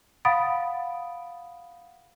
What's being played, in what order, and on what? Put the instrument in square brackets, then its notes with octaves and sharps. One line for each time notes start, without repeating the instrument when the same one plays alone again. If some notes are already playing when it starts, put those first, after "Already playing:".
[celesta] F5 F#5 B5 D#6 A6 D7